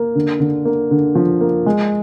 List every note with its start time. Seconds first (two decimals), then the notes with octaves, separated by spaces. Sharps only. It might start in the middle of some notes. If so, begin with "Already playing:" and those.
Already playing: A#3
0.15 D3
0.40 D3
0.65 A#3
0.91 D3
1.15 F3
1.41 A#3
1.66 G#3